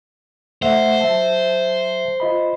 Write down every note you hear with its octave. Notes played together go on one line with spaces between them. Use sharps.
A3 C5 E5 F#5
F#3 E5 A5
F4 D#5 B5